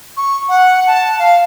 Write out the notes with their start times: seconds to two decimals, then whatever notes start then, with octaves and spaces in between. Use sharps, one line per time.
0.17 C#6
0.49 F#5
0.87 A5
1.19 F5